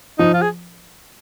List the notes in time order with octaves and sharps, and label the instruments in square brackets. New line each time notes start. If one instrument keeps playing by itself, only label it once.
[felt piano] F3 [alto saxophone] D#4
[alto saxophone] F4
G#4